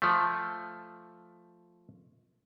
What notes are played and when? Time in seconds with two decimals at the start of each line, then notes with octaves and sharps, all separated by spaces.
0.02 F3 A3